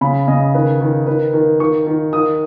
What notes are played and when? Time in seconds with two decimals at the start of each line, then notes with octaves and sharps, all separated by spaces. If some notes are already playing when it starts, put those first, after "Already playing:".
0.01 C#3 B5
0.28 C#3 D#5
0.54 D#3 B4
0.81 D#3
1.07 D#3 B4
1.34 D#3
1.60 D#3 C#6
1.87 D#3
2.13 D#3 D#6